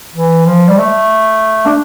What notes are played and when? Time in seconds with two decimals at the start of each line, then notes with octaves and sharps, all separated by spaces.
0.15 E3
0.46 F3
0.68 G3
0.78 A3
1.66 D4